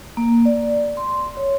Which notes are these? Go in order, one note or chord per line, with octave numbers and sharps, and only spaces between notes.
A#3
D5
C6
C#5